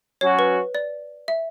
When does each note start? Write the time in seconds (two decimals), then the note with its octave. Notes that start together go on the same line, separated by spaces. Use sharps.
0.21 F#3 C#4 F#4 C#5
0.39 B4
0.75 D5
1.28 E5